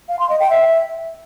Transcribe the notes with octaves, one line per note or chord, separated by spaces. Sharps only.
F5
C6
D#5
G5
E5